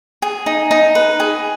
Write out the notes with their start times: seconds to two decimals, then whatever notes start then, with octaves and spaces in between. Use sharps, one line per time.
0.22 G#4
0.46 D#4
0.71 D#4
0.95 B4
1.20 G#4